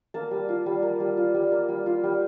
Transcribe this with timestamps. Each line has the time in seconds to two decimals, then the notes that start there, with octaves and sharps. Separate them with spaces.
0.14 A#3 A5
0.31 G3
0.49 F4
0.66 G3
0.83 A#3
1.00 G3
1.17 F4
1.34 G3
1.52 A#3
1.69 G3
1.86 F4
2.04 G3